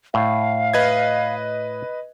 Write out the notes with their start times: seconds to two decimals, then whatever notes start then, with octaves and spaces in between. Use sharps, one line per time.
0.14 A2 F5
0.74 B4 D#5 G#6